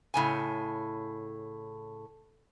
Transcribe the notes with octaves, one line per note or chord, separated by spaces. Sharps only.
A2 C#3 G#5